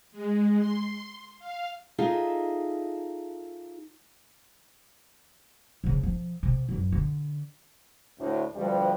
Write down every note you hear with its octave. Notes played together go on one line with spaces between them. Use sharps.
G#3
C6
F5
D#4 F4 G#4 A4 D#5 E5
G#2 C#3
F3
C3
A1 F#2
D3
D2 A2
D2 G2 F3 G3